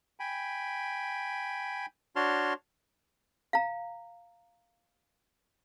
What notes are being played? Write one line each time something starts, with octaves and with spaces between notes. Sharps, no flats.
G5 G#5 B5
D4 F#4 C#5 A5 C6 F6
F5 A#5